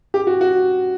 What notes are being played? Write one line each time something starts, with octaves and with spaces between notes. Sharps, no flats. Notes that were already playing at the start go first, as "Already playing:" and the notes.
G4
F#4
F#4